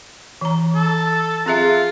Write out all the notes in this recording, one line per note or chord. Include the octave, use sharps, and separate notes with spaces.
E3 A#5
A4
C4 F4 G#4 E5